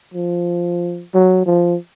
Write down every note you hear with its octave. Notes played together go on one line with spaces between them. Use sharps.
F3
F#3
F3